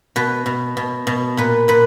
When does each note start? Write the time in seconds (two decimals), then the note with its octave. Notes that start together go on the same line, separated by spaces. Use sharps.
0.16 B2 B4
0.46 B2
0.77 B2
1.07 B2
1.37 A#2 B4
1.68 A#2 B4